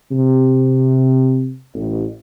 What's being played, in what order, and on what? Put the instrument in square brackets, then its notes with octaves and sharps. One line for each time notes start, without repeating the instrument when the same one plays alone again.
[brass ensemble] C3
A1